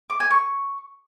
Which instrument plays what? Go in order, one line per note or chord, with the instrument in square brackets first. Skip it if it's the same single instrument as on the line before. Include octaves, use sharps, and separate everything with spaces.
[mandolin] D6
G#5
C#6